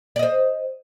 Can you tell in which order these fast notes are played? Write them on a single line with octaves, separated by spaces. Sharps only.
D5 D#5 C5